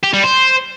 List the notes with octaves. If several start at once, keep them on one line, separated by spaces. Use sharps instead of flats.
G4
G3
C5